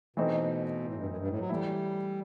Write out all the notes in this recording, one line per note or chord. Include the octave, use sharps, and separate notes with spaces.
B2 E3 A3 C4 D#4
A2
G2
F#2
G2
A2
F#3
E3 G3 A3 E4